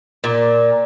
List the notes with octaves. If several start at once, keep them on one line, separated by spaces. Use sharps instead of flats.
A#2